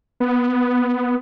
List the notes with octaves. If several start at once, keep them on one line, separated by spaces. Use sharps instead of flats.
B3